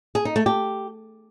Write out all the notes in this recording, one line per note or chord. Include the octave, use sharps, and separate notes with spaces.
G#4
D#4
A3
G4